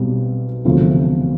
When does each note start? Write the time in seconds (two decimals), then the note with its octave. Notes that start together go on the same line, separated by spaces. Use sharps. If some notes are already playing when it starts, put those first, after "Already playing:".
Already playing: B1 B2 G3 C4
0.64 E1 D2 C3 F3 A3